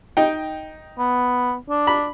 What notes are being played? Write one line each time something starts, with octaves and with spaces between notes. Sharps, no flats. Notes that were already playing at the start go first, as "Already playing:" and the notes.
D#4 G5
B3
D4
B5